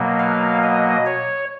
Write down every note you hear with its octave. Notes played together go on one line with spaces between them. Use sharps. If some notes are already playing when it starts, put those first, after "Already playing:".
Already playing: B2 F#3 A#3
F5
D#5
C#5